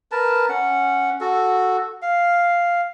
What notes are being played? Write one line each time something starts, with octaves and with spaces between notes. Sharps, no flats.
A#4 B4 A5
C#4 F#5
F#4 A4
F5